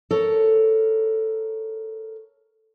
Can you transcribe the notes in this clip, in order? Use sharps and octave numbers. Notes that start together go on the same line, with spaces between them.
A4 A#4 C#5